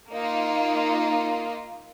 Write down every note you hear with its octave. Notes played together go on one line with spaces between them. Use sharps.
A#3 D#4 F4